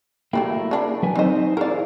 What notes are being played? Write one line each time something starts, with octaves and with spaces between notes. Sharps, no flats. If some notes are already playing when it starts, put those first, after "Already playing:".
F#3 A3 A#3 E4 G4
C#3 D4
F#3 B4 G#5
C4 D#4 C5 D#5
E4 G#4 A#4 D5 F5